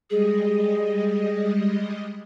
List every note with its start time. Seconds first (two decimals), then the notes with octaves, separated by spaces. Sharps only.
0.10 G3 G#3 G#4 D#5